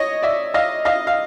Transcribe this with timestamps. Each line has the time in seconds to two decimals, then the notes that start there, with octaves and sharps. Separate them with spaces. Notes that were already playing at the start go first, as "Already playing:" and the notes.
Already playing: C#5 D#5
0.22 D5 E5
0.54 D#5 F5
0.85 D#5 F5
1.07 F5